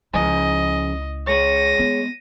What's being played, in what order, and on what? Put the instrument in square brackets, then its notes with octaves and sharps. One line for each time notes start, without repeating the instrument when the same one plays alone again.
[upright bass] C#2 E4 [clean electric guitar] C#3 F3 G#5 [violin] D#5
[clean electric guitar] G#3 C#5 [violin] A#6 D#7
[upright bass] B3